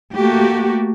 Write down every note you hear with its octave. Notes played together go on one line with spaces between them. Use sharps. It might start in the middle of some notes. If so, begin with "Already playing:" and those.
A3 A#3 F#4 G4